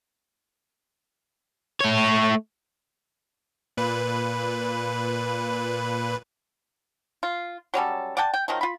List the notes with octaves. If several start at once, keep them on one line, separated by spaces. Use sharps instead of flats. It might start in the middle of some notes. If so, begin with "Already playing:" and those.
A3 C#5
A#2 B4
F4
F#3 G3 C#4 A4
D5 F#5 G5 A5
G5
D#3 F3 F#3 D#4
F4 B5